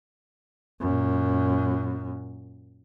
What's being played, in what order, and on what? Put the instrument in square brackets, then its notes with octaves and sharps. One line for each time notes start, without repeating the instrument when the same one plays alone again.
[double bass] F#2 A#2